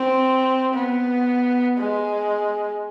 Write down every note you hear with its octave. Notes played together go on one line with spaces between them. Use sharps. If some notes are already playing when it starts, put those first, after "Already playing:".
Already playing: C4
B3
G#3